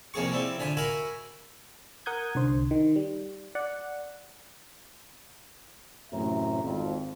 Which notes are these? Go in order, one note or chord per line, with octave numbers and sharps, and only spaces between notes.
C2 F2 A#3 G#4 C#6
G3 C4 E4
D2 F3 G#5 B5
F#4 A#4 E5 G#5 B5
A#4 F#5 D#6 G6 G#6
C2 D3 C5
D#3
G3
D5 F#5
A1 F#2 A2 C3 E5 A#5
G#1 F2